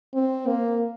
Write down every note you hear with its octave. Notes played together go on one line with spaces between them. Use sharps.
C4
A#3